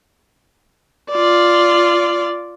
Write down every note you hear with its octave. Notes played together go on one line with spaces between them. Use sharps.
F4 D5